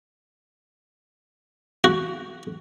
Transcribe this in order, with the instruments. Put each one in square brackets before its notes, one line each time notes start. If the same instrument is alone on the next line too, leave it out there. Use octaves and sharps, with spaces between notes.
[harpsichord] F#4